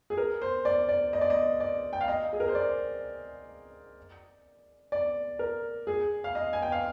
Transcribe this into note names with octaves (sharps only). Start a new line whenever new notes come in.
G#4
A#4
C5
D5
D5
D#5
D5
D#5
D5
G5
F5
D#5
G#4
A#4
C5
D5
D5
A#4
G#4
F5
D#5
G#5
G5
F5